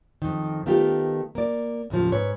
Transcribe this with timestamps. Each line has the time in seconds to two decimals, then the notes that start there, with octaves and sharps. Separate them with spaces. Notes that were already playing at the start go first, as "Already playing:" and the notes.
0.22 F2 D#3
0.66 D#3 A3 B3 F4 G4
1.35 A#3 D5
1.90 D#2 A2 C#3 F3
2.12 G#2 B4 C#5